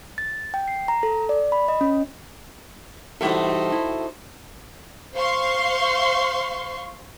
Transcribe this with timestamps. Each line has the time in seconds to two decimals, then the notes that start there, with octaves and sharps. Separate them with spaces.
0.18 A6
0.54 G5
0.68 C7
0.88 A#5
1.03 A4
1.29 D5
1.52 B5
1.68 D#5
1.81 C#4
3.21 E3 G3 A3 D#4 F#4 A4 C5 E5
3.72 E4
5.15 C5 F5 C6 C#6